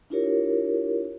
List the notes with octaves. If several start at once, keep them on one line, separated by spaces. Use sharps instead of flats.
D4 E4 F4 G4 A#4 C#5